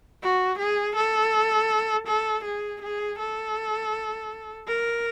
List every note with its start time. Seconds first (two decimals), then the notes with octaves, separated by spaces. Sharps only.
0.22 F#4
0.59 G#4
0.96 A4
2.07 A4
2.44 G#4
2.82 G#4
3.18 A4
4.67 A#4